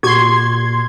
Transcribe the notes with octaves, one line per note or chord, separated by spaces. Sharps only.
A#2 F#4 G4 C6 C#6 G#6